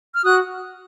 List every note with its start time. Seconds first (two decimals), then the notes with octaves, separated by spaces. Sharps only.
0.15 F6
0.23 F#4 D#6 F#6